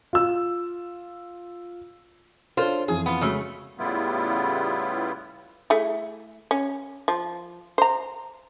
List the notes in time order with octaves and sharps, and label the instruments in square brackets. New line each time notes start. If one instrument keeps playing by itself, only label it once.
[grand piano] F4 E6
[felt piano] D4 A4 C#5 [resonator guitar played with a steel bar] F4 C5
[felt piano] F2 E3 [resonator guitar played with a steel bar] G#4
[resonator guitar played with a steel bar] B3 F4
[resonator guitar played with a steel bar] C#3 A3 [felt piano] G#3 C#4 F#4
[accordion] A2 C#3 G3 B3 E4 F4
[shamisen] A3 E4 G#4
C#4
F3
C5 A#5